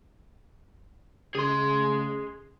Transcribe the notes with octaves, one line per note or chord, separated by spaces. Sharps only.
C#3 G#4 C6